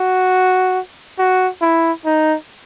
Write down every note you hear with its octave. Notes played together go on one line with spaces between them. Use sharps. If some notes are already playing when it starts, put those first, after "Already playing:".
Already playing: F#4
F#4
E4
D#4